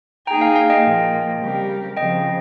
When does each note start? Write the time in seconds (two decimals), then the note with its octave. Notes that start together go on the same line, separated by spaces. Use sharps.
0.27 A#3 D#4 G#4 G5 A#5
0.41 F5 G#5
0.55 F5 G#5
0.70 D#5 G5
0.84 A#2 F3 A#3
1.41 C#3 G3 C4 G4 A#4
1.97 C#3 F3 C4 D#5 G5